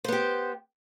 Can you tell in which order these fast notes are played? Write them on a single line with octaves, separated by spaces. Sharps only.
C5 B3 G4